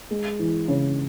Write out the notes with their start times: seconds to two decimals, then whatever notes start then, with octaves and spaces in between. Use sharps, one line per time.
0.11 G#3
0.39 E3
0.68 C#3